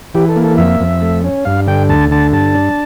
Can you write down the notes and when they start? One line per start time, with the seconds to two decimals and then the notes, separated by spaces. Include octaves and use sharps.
0.15 E3 G4
0.29 A4
0.36 A#3
0.44 A4
0.58 F2 E5
0.80 F2
1.02 A3
1.24 C#4
1.45 G2 F5
1.67 D3 G5
1.89 D2 A5
2.11 D3 A5
2.32 G2 A5
2.55 D4